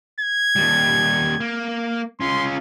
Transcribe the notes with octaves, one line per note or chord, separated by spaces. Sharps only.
G#6
D#2 G3
A#3
C#4 F4 C6